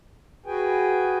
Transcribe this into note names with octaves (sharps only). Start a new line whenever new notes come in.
F#4 G#4 B4 G5 G#5